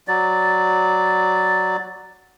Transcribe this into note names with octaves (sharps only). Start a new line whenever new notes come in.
F#3 D5